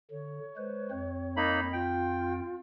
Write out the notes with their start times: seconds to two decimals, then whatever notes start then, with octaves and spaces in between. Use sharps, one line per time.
0.11 D3 C#5
0.57 G#3 B4 C5
0.91 F2 C4
1.37 A#3 D#4 B5
1.73 F4 G5